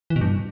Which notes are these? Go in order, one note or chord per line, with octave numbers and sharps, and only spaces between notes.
E3
B2
G2